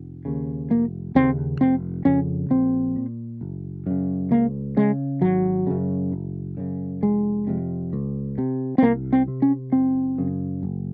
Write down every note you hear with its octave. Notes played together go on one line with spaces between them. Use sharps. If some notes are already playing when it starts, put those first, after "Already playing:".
Already playing: F1
D#2 C#3
F1 A#3
D#2 C#3 C4
F1 C4
F2 C#3 C#4
A#1 C4
A#2
F#1
F#2 C#3
C#2 A#3
C#3 G#3
G#1 F#3
F#2 C#3
F#1
F#2 C#3
F1 G#3
F2 C3
C#2
C3
C4
C2 A#3
C4
C3
C#4
F#1 C4
F#2 C#3
F#1